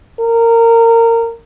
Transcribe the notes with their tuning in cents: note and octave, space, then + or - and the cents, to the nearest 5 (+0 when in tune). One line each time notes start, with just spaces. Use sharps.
A#4 -20